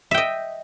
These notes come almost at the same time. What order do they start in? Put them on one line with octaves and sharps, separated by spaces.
E5 G5 D#5